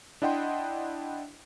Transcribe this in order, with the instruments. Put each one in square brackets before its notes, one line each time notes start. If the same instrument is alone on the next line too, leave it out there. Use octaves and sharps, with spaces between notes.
[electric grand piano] D4 E4 D#5 F#5 G5 C6